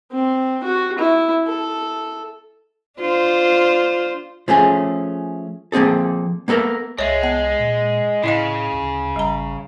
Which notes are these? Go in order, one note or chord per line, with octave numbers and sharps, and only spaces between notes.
C4
F#4
E4
A4
D4 F4 C5
F3 A3 C#4 G#4
F3 A#3 C4 G#4 A4
A#3 B3 A4 A#4
C2 G#3 C#5 E5
B3 A5
A#2
A2 C#3 E4 D#5 F5
D2
G#1 G3 A#5